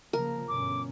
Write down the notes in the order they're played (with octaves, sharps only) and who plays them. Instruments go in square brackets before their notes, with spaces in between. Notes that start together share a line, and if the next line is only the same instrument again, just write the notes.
[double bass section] C#3 F3 A#3 [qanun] A#4
[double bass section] G1 B2 C#4 [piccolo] D6